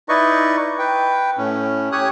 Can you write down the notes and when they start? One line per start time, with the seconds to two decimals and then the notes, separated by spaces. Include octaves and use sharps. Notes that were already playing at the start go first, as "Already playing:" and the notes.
0.09 D#4 E4 B4 D5 D#5 C#6
0.79 B4 G5
1.38 A2 C#4
1.92 G4 C#5 G#5 D#6 F#6